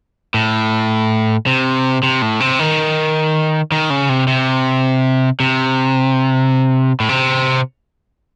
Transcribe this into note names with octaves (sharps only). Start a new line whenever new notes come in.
A2
C3
C3
A2
C3
D#3
D#3
C#3
C3
C3
C3
A2
C3